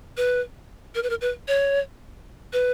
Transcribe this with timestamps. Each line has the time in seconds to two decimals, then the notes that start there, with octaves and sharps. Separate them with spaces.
0.17 B4
0.95 A#4
1.03 B4
1.10 A#4
1.21 B4
1.48 C#5
2.53 B4